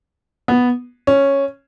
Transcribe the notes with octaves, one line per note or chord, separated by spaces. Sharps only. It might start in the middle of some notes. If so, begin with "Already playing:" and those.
B3
C#4